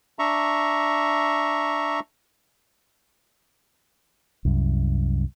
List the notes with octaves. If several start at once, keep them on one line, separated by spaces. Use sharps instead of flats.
D4 E5 A#5 C#6
C2 F#2